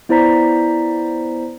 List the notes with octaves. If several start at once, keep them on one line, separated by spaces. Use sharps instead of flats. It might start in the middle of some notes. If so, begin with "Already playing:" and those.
B3 E4 C5 D5 A#5 B6